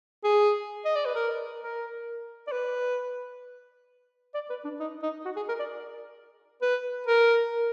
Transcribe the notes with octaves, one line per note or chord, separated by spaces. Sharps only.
G#4
D#5
D5
B4
A#4
A#4
D5
B4
D5
B4
D4
D#4
D#4
F#4
G#4
A#4
D5
B4
A#4